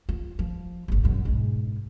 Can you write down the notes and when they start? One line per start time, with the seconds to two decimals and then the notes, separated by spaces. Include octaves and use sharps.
0.09 F4
0.39 F3
0.88 D1 G#1
1.03 B1 F#2
1.25 G#2 B2